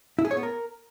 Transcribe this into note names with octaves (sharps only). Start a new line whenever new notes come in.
E4
G#4
C#5
B3
A#4